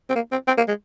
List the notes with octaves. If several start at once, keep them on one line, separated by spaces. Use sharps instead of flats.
C4
A#3
C4
C4
A#3
G#3